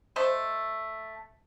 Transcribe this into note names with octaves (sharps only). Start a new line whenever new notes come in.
A3 C5 D#5